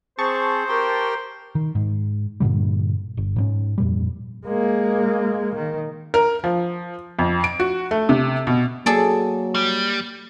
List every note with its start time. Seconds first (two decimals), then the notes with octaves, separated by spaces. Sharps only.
0.19 C4 G#4 C5 A5 C#6 A6
0.69 G4 A#4 G5 C6
1.55 D#3
1.75 G#2
2.40 G2 A#2 D3 G3
3.17 G1
3.36 G#2 F#3 C#4
3.78 F2 A#2 G3
4.46 G#3 A#3
5.56 D#3
6.14 A#4
6.44 F3
7.19 F2
7.44 D7
7.60 F#4
7.91 A3
8.09 C3
8.47 B2
8.86 F#3 A#3 G#4 A4 D5
9.55 G3